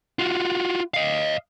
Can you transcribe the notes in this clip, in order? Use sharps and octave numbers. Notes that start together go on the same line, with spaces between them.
F4 F#4
D#5 F5